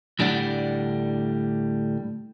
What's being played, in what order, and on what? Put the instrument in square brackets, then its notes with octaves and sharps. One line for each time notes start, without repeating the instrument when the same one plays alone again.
[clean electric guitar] D2 A2 G3 D4 D5 F#5